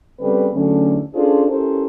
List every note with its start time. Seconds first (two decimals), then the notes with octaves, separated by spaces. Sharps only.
0.19 C#3 G3 B3 C4 A4 B4
0.54 E2 D3 F#3 A3 C#4
1.14 C#4 D4 F4 G#4 A4 C5
1.47 C#4 E4 G4 A4 A#4 C5